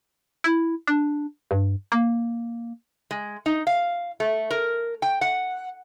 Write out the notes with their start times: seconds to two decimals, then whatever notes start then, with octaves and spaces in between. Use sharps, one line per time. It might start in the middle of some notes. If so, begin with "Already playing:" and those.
0.44 E4
0.87 D4
1.51 G2
1.92 A#3
3.11 G#3
3.46 D#4
3.67 F5
4.20 A3
4.50 A#4
5.02 G5
5.21 F#5